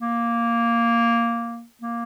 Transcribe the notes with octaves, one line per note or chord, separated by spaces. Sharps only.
A#3
A#3